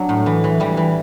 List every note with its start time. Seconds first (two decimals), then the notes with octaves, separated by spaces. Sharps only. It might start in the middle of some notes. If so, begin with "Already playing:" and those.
Already playing: F#3 D4
0.09 A2
0.26 E3
0.44 E3
0.60 E3 G3
0.77 E3